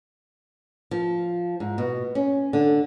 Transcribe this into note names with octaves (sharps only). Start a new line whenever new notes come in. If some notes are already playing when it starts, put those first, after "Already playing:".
F3
G#2
B2
C#4
D3